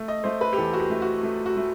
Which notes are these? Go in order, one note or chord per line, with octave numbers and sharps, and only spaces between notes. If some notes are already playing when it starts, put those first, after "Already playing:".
Already playing: A3
D#5
A3 C5
B4
G4
E2 A4
F#4
G4
A3
F#4
A3
F#4
A3